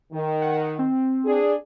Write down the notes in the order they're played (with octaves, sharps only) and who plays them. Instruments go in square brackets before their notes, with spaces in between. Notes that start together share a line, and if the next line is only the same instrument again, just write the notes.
[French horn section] D#3
[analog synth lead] F#5
C4
[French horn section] D4 G#4